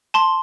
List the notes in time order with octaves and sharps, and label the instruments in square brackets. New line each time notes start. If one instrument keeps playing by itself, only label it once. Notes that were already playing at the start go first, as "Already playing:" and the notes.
[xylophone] A5 C6